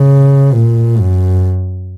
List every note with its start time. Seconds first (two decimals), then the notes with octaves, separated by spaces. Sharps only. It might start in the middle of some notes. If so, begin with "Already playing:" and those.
Already playing: C#3
0.53 A#2
0.98 F#2